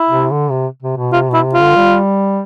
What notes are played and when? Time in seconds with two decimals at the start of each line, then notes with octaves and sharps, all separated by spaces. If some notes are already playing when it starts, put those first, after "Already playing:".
Already playing: E4
0.09 C3
0.31 D3
0.50 C3
0.83 C3
0.97 B2
1.13 C3 F4
1.29 B2 E4
1.44 C3
1.54 F4
1.60 D3
1.76 G3